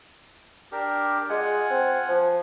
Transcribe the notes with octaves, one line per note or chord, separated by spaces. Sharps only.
D4 G4 A#4
G#3 F4 F#5 G#5
C4
F3